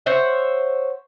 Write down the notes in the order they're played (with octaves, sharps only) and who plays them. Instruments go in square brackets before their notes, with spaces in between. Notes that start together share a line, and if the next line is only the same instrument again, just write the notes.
[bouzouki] C5 C#5 E5 F#5